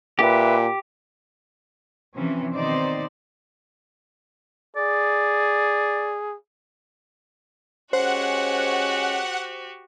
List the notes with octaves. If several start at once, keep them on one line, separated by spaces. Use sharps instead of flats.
A#2 G4 B4 E5
C3 E3 F3 C4 C#4
B2 D#3 C4 D#4 C5 D5
G#4 D5
G#3 C#4 F#4 G4 C5 F#5